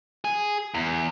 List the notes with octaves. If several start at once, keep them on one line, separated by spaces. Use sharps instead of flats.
G#4
E2